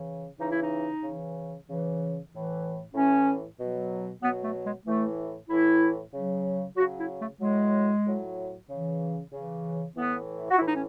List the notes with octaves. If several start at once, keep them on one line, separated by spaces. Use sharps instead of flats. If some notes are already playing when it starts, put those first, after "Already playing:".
Already playing: C#3 E3
C#3 E3 D#4
E4
D#4
C#3 E3
C#3 E3
A2 E3
A2 E3 C#4
B2 F#3
B2 F#3 B3
A3
G#3
A2 E3 A3
A2 E3 E4
C#3 F#3
C#3 F#3 F#4
E4
A3
A2 F#3 G#3
A2 F#3
C#3 E3
C#3 E3
A2 E3 B3
F#4
E4
A2 E3 D#4
C#4